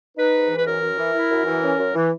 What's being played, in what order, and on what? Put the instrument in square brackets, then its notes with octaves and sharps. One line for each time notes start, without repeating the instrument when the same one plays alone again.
[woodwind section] D#4 B4
G#2
E3
B4
F#2 A#4
F#2
E3
E4
F#2
E3
C#4
F#2
E3